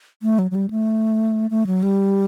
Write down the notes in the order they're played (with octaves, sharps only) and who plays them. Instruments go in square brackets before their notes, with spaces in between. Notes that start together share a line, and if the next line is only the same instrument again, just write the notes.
[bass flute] A3
F#3
F#3
G3
A3
A3
F#3
G3